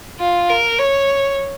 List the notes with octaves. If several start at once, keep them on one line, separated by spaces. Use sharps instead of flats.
F4
A#4
C#5